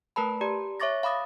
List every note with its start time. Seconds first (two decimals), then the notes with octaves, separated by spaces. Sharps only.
0.16 A3 A#4 B4 A5 B5
0.41 G4 D5 A#5
0.80 C#5 E5 C#6 D6 A6 A#6
1.03 F5 B5 D6 D#6 A6